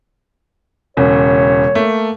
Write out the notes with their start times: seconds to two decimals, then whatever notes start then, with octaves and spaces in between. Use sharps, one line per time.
0.97 E1 C#3 C#5
1.75 A3 A#3